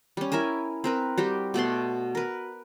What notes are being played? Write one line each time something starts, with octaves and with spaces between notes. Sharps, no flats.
G3 C#4
E4 A#4 E5 G#5
C4 A#4 B4
G3 F#4 G4
B2 A3 D5 C6
A#4 B4